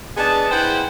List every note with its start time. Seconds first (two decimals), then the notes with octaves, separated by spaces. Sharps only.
0.17 B3 D4 D#4 G#4 A5
0.50 E4 G#4 B4 C5 F#5 G5